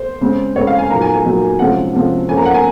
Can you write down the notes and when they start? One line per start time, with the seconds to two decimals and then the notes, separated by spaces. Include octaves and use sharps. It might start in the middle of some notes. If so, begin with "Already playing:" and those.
Already playing: C5
0.21 C#3 G#3 C4
0.56 C#3 G#3 C4 C#5
0.67 F5
0.78 G#5
0.90 A#2 F#3 A#3 D#4 A#5
1.01 G#5
1.13 G#5
1.25 A#2 F#3 A#3 D#4
1.59 C3 F3 G#3 C#4 F#5
1.94 C3 F3 G#3 C#4
2.29 F3 A#3 C#4 G#5
2.37 A#5
2.45 F#5
2.54 G#5